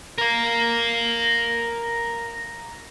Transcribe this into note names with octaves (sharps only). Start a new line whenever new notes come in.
A#4 F5